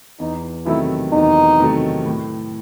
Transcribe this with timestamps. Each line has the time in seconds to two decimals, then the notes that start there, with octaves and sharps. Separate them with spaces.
0.20 E2 D#4
0.66 C3 D#3 F#3 A3 E4
1.13 E2 D#4
1.59 C3 D#3 F#3 A3
2.06 A2